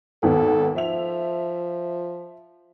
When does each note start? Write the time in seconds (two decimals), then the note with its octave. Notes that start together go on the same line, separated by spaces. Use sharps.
0.23 G#1 D#2 B3 A4
0.76 F3 E5 F7